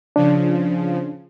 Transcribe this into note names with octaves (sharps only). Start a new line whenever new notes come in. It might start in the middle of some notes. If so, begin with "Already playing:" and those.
C#3 F3 D4